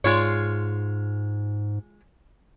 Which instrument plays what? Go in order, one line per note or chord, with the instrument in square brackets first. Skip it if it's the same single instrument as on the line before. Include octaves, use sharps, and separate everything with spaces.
[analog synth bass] G#2 [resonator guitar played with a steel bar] G#3 F4 C#5